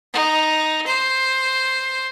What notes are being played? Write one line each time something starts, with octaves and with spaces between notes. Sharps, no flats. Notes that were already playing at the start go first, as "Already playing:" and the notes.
D#4
C5